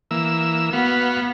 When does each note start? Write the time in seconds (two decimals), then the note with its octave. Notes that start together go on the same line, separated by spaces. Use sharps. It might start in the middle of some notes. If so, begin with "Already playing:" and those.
0.11 E3 A#3 E6
0.73 B3 F#4 B4 F5